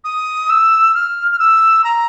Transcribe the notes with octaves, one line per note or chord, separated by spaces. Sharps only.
D#6
E6
F6
F6
E6
A#5